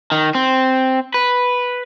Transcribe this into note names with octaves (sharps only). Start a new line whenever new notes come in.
D#3
C4
B4